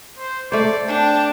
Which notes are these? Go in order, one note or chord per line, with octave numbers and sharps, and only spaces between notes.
C5
A3 C5 D5
D4 G5